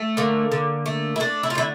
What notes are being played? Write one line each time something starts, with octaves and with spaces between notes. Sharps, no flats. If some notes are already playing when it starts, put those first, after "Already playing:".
Already playing: A3
D3 A#3
D3
A3
E4
A3 D4
E4
F4
D3 E4